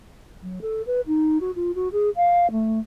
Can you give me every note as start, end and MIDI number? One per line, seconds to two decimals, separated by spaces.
0.43 0.59 54
0.62 0.82 69
0.87 1.01 71
1.07 1.38 63
1.41 1.51 66
1.56 1.71 65
1.75 1.88 66
1.92 2.10 68
2.16 2.51 77
2.51 2.79 57